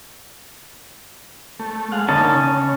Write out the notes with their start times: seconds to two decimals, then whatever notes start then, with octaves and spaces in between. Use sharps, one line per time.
1.59 A3
1.92 G#3 F5 F#5
2.08 D3 A#3 C#4 D#4 A5
2.35 C#3